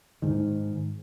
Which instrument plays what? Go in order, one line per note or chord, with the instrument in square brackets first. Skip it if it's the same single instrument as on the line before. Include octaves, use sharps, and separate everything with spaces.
[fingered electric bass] G#2 D#3